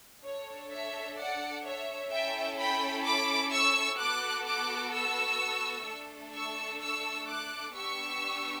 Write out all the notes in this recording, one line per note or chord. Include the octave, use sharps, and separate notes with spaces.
D4 A4 C#5
C#5 E5
D5 F#5
C#5 E5
C#4 E4 A4 E5 G5
G5 B5
B5 D6
C#6 E6
B3 F#4 A4 D6 F#6
D6 F#6
C#6 E6
A3 D4 A4
C#6 E6
C#6 E6
D6 F#6
B3 D4 G4 C#6 E6